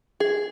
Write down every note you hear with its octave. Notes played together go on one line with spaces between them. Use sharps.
G#4